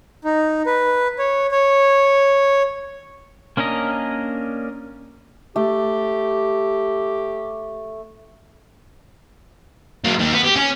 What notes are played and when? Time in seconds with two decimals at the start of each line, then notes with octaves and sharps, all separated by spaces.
0.24 D#4
0.66 B4
1.19 C#5
1.51 C#5
3.57 A#3 C#4 D4 A#4 D#5
5.56 A3 G4
10.04 F#3 A#3
10.19 D#3 A#3
10.32 B3
10.44 G4
10.56 C#4